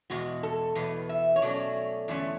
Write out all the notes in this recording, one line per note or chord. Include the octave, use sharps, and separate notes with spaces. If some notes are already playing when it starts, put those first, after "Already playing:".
E2 B2 G#3 F#4
A4
E2 B2 B3
E5
C#5
B2 F#3 A3 C#4 D5
E2 D3 A3 C#4